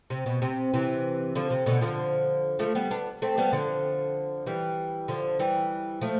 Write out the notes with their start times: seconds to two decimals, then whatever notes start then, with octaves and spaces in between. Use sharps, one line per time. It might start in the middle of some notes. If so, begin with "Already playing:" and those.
0.10 C3
0.26 B2
0.42 C3
0.73 C3 E3
1.36 D3 F3
1.50 C3
1.66 B2 D3
1.81 D3 F3
2.59 F3 A3
2.75 G3 B3
2.90 B3 D4
3.22 A3 C4
3.38 G3 B3
3.52 D3 F3
4.46 E3 G3
5.08 D3 F3
5.39 E3 G3
6.01 F3 A3